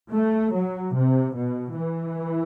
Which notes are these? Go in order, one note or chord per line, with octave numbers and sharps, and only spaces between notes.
A3
F#3
C3
B2
E3